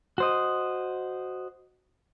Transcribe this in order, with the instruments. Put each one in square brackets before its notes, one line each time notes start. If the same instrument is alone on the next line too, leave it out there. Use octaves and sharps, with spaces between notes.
[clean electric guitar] F#4 C5 D#5